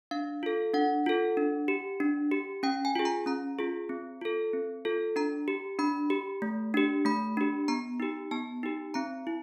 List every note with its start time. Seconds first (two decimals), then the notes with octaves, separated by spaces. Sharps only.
0.11 D4 F5
0.43 F4 A4
0.74 D4 F#5
1.06 F4 A4
1.37 D4
1.68 G4
2.00 D4
2.32 G4
2.63 C#4 G5
2.85 G#5
2.95 F4 G#4
3.05 A#5
3.26 C#4 A#5
3.59 F4 G#4
3.89 C4
4.21 F4 A4
4.53 C4
4.85 F4 A4
5.16 D4 A#5
5.48 G4
5.79 D4 B5
6.10 G4
6.42 A3
6.74 D4 G4
7.05 A3 B5
7.37 D4 G4
7.68 B3 A#5
8.00 D#4 G4
8.31 B3 A5
8.63 D#4 G4
8.94 C4 A#5
9.27 E4